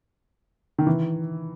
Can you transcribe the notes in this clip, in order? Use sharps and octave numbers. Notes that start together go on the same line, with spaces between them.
D#3
E3